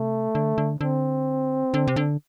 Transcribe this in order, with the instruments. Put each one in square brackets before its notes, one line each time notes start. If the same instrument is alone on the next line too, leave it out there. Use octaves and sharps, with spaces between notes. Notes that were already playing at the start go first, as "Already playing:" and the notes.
Already playing: [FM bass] C3 [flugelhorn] A3
[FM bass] D3
D3
[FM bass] D3 [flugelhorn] C4
[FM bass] D3
C3
D3